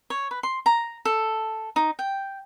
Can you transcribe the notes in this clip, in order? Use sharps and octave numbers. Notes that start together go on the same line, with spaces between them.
C#5
B4
C6
A#5
A4
D#4
G5